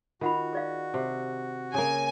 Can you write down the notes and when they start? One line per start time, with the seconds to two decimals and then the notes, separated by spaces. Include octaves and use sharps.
0.21 D#3 F4 F#4 F#5 B5
0.53 G#4 D5 F5
0.94 C3
1.74 C#3 A#3 G#5